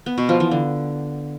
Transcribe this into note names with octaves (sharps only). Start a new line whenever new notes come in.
B3
B2
F3
E3
D3